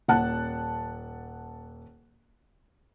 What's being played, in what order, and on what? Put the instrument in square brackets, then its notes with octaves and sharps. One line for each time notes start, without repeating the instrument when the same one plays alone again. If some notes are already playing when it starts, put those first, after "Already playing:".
[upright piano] D#1 F#5 A5 F#6